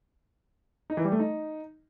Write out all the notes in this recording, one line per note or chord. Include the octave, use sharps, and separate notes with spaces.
D#4
E3
G3
A3
D#4